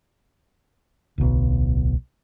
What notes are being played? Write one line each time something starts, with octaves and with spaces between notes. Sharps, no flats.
D1 B1